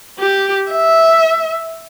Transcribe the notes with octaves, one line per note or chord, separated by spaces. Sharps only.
G4
E5